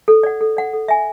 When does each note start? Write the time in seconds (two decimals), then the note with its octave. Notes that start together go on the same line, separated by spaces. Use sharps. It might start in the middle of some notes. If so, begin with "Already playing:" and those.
0.08 A4
0.23 D5 F#5
0.41 A4
0.57 D5 F#5
0.73 A4
0.88 E5 G#5